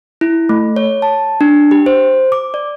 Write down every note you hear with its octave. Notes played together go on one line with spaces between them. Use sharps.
E4
A3
C#5
A5
D4
G4
C5
D6
D5